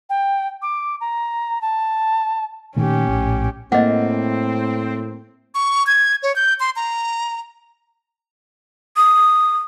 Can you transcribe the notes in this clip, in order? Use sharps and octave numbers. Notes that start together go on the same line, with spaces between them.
G5
D6
A#5
A5
A#2 D#3 A3 C#4 G4
A#1 A2
A2 A#3 C4 D#5 F#5
C#6
G#6
C#5
G6
C6
A#5
D#6